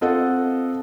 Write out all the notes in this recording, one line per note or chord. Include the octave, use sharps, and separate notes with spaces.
C4 F4 A4 D#5 F#5